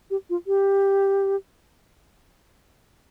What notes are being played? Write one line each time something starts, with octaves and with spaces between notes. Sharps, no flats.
G4
F4
G4